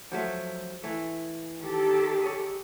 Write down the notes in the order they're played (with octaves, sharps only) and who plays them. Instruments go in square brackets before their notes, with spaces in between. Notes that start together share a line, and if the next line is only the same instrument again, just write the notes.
[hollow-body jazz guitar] F3 F#3 A3
E3 A3
[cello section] D#3 G4 A4
[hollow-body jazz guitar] G#4 C#5